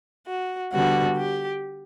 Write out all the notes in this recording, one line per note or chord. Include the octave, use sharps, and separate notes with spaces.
F#4
D3 G3 B3 F#4
G4